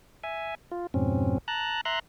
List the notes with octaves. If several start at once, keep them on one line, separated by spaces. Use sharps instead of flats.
E5 G#5
F4
F2 G#2 B2 C4 C#4
A5 A#5 F#6
E5 A#5 C6 F#6